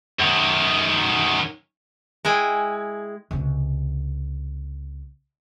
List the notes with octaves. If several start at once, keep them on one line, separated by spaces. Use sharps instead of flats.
F#2 D#3
G#3 E4 G5 G#5
C#2 C3